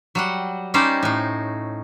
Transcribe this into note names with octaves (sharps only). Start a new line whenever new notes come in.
F#3 G3 F#5
G3 C#4 D#4 C5 D5
A2 D#4